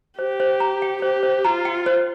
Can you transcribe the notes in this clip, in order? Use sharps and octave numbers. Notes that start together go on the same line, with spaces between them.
G4 C5
C5
A#5
G5
G4 C5
C5
F4 A#5
G5
C5